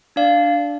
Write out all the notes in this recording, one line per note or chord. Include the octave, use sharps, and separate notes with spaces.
D4 D5 F5
D4